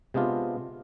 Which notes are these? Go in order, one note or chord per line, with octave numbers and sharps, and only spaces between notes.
C3 G#3 B3 D4 F4